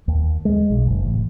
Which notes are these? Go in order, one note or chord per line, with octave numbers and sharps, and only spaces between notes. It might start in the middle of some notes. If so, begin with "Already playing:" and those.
D#2
G#3
B1
F#1
A1